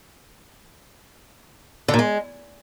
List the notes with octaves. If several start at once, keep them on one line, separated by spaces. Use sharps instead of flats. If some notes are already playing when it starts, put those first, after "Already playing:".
D3
A#2
G#3